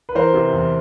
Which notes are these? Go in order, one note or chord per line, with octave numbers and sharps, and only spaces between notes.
B4
E3 A#4 C5
C3
E2